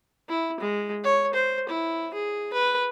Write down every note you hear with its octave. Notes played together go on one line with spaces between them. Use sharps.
E4
G#3
C#5
C5
E4
G#4
B4